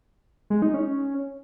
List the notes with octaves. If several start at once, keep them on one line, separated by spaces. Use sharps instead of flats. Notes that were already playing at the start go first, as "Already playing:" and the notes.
G#3
D#4
C#4